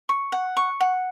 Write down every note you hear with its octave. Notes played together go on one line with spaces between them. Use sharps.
C#6
F#5
C#6
F#5